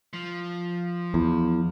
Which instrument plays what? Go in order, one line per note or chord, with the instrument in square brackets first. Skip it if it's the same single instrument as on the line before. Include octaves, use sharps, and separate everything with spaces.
[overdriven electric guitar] F3
[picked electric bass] E2